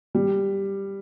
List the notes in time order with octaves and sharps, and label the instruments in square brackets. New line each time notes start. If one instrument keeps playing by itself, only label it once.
[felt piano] G3